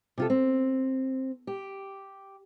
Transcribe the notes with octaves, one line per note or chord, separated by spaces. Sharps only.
C3 F4 A4
C4
G4